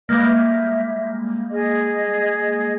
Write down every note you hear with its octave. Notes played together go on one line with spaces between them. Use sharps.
G3 G#3 A#3 B4 D#5 F5
E5
G#4 D#5